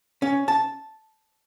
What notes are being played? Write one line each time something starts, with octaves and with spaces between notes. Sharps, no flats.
C#4
A5